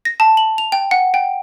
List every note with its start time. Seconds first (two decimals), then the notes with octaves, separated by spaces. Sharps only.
0.05 A#6
0.20 A5
0.37 F#7
0.58 F7
0.72 G5
0.91 F#5
1.14 G5